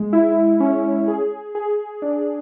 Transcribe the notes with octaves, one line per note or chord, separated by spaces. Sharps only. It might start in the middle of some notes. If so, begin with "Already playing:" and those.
Already playing: G#3
E4
C#4
G#4
G#4
D4